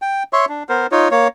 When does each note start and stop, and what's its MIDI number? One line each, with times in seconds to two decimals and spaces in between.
0.02 0.23 79
0.33 0.45 73
0.33 0.45 76
0.33 0.45 84
0.33 0.45 85
0.49 0.63 62
0.69 0.87 59
0.69 0.87 70
0.69 0.87 72
0.92 1.08 63
0.92 1.08 65
0.92 1.08 73
1.11 1.28 58
1.11 1.28 73